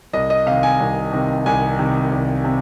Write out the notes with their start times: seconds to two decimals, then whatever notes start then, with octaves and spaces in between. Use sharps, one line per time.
0.13 C2 D#5
0.30 D#5
0.46 C3 D#3 F5
0.63 G#5
0.80 C2
1.12 C3 D#3
1.46 C2 G#5
1.79 C3 D#3
2.12 C2
2.44 C3